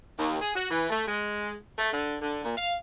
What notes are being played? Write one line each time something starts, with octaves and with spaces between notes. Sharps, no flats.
D#2
G#4
F#4
E3
A3
G#3
A3
D3
D3
A#2
F5